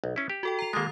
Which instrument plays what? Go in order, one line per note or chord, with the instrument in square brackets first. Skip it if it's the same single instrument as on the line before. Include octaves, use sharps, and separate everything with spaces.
[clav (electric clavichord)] B1
C#4 E4
G4
[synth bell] F#4 A4 G5
A#5 C7 F7
[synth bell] D#3 D#6 A6 [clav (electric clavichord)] G#3 A#3